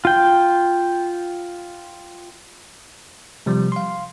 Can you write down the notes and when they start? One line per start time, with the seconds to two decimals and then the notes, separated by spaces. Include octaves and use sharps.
0.05 F4 G5
3.46 C3 F3 G3
3.72 F5 C6